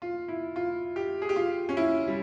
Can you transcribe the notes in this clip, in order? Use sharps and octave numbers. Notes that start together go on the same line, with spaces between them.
F4
E4
F4
G4
G#4
G4
F4
C#4
E4
G3